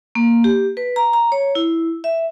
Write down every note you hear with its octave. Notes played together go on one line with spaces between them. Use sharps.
A#3
G4
B4
A#5
A#5
C#5
E4
E5